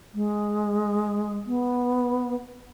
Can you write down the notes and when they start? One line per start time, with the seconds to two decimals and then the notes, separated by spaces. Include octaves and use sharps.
0.14 G#3
1.47 B3